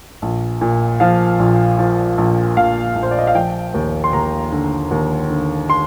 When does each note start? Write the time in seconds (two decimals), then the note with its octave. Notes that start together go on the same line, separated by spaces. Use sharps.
0.22 A#1
0.61 A#2
1.00 F3 F5
1.39 A#1
1.79 F3
2.18 A#1
2.57 A#1 F5
2.95 A#1
3.03 C5
3.11 D5
3.19 D#5
3.27 F5
3.35 F3 G5
3.74 D#2
4.04 C6
4.13 D#2 A#5
4.52 D3
4.91 D#2
5.30 D3
5.70 C6